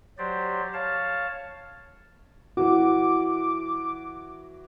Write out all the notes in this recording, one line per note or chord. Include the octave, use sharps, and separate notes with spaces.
F#3 G4 C5 D5
C#5 F5 A5
E3 F#4 D6